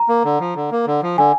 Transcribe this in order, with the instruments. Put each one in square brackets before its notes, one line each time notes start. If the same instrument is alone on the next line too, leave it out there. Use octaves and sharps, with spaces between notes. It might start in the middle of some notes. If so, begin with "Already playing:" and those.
Already playing: [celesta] A#5
[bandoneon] A#3
D3
F3
D3
A#3
D3
F3
[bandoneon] D3 [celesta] G#5